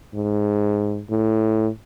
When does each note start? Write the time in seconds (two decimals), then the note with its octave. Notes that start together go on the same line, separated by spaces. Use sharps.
0.15 G#2
1.10 A2